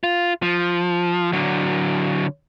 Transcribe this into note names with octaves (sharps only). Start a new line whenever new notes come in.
F4
F3
D3 F#3